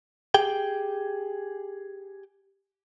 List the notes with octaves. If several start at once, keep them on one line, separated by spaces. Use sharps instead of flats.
G4 G#4 G5